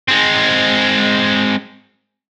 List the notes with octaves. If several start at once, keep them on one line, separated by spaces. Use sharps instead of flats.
G#3 C4